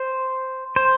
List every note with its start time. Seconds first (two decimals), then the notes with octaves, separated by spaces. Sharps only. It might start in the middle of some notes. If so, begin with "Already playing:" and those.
Already playing: C5
0.76 C5